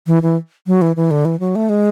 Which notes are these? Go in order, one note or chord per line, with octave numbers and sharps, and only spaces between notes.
E3
E3
F#3
E3
E3
D3
E3
F#3
A3
G#3